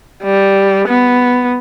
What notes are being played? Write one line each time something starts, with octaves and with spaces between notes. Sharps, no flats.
G3
B3